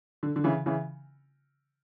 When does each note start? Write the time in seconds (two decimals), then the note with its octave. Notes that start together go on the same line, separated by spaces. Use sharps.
0.23 D3
0.36 D3
0.44 C#3 E3
0.66 C#3 E3